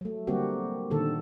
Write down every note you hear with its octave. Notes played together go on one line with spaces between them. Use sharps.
F#3 A3
D3 G3 A#3 C4 F#4 G4
A#2 D3 D#3 A4